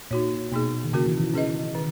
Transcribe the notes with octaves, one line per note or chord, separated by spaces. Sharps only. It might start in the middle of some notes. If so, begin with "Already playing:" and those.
A#2 D#4 F#4 C#5
B2 A#3 D#4 G#4
D#3
C#3 A#3 C#4 F#4 A#4
E3
E3
E3 C#4 G#4 B4 D#5
D#3